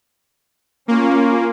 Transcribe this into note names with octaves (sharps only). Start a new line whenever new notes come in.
A#3 C#4 F4